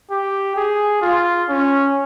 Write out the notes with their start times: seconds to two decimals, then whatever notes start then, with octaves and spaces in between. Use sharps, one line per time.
0.11 G4
0.56 G#4
1.02 F4
1.49 C#4